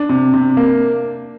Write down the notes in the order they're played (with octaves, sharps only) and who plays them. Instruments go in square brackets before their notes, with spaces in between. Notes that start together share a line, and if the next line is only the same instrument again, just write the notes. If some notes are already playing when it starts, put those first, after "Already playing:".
Already playing: [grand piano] D4
[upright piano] C3
C3
A#3